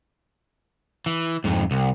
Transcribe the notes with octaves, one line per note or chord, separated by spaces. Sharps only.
E3
F2 G#2
C2